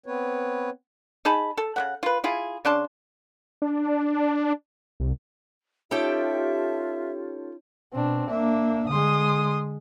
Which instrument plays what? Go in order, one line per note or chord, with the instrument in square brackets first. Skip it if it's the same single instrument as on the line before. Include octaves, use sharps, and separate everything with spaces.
[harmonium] B3 C4 B4 C#5
[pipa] D#4 G#4 A5 B5
A4
C#3 B3 F#5
F4 B4
E4 F4 G#4
C#3 D4 A5 C6
[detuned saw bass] D4
C2
[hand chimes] C#4 D#4 C#5 [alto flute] F4 [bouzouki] G4 A4 G5 [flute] E5
[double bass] B2 [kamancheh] C4 D4
[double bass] A#3 D4 [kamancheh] E5
[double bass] D3 G#3 [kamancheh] C6 D#6